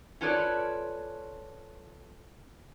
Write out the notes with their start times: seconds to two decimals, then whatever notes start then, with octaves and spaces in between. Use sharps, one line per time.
0.21 C#4 F4 A4 B4 C#5 D5